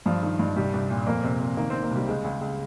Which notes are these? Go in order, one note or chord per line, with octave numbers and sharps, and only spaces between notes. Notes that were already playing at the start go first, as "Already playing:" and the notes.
G2 F3
D#3
G2
C2 G3
C2
A#2
F2 A#3
C3
C3
D#3 A#3
D#3 C4
A#3
C2 G3
C#2 G#3
C#2
C#2